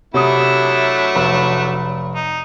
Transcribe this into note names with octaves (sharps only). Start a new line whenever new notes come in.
C3 F#3 A3 D4 E4 D#6
F1 B5
D#4